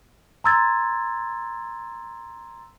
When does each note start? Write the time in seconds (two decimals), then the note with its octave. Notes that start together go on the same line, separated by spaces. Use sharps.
0.44 A#5 C6 E6 G#6 A6